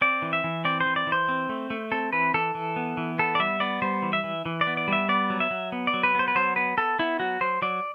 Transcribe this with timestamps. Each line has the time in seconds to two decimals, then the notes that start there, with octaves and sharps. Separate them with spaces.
0.01 C4 D5
0.22 E3
0.33 E5
0.44 E3
0.65 C4 D5
0.80 C5
0.86 E3
0.96 D5
1.07 E3
1.12 C5
1.29 C4
1.49 A3
1.70 A3
1.92 C4 A4
2.13 E3 B4
2.34 E3 A4
2.55 E3
2.76 B3
2.97 E3
3.19 B3 A4
3.35 D5
3.39 G3 E5
3.60 B3 D5
3.82 G3 C5
4.02 E3
4.13 E5
4.24 E3
4.46 E3
4.61 D5
4.67 B3
4.77 D5
4.88 G3 E5
5.09 B3 D5
5.30 F#3
5.40 E5
5.51 F#3
5.72 B3
5.87 D5
5.94 F#3
6.03 B4
6.15 B3 C5
6.28 B4
6.35 F#3 C5
6.56 B3 B4
6.77 B3 A4
6.99 B3 E4
7.20 F#3 F#4
7.41 F#3 C5
7.62 F#3 D5